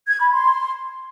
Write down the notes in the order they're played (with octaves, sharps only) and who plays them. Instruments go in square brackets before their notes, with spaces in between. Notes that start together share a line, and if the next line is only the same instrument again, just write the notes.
[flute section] G#6
B5
C6